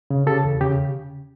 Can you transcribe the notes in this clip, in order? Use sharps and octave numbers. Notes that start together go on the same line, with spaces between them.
C#3
C#3 G4 A4
E2
C#3 G4